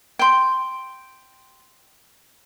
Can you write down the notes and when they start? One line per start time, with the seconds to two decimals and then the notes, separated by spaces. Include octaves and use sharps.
0.19 G5 C6